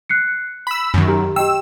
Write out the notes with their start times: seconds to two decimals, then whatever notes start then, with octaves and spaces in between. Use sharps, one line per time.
0.09 F#6 C7 C#7
0.67 B5 E6
0.94 F#2 D#3
1.08 G4 A#5
1.36 G4 D#5 G5 E6